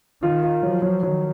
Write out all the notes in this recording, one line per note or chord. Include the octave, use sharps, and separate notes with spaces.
D#3 F4
F4
F3 F#3
F#3
D#3 F#3